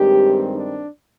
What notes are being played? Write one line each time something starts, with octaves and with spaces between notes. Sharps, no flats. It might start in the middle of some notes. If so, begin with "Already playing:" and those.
Already playing: G2 D#3 G#3 C4 G4
D4